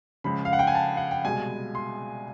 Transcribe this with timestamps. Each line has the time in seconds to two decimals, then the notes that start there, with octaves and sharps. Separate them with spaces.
0.24 C#2 C#3 F3 B5
0.45 F5
0.53 F#5
0.59 G5
0.67 G#5
0.75 A5
0.97 F#5
1.11 G5
1.24 C2 B2 G#3 G#5
1.75 C6